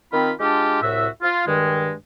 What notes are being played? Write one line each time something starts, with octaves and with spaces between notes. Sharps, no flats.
D#3 C4 F4 B5
G#3 D4 F4 G4
C2 A2 F#4 E5
F4
G2 D#3 G#3